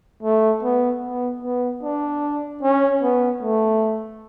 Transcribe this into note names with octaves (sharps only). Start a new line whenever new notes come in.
A3
B3
B3
B3
D4
C#4
B3
A3